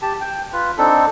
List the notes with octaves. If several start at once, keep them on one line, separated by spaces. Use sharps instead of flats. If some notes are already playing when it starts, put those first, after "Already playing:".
G4 A5
G5
F4 B4
C4 D4 D#4 A4